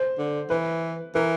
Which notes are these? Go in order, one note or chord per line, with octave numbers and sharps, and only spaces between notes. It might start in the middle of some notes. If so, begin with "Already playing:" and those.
Already playing: C5
D3
E3 B4
E3 A#4